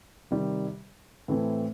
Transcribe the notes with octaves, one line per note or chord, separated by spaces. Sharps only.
C3 D#3 G3
A2 E3 A3 C4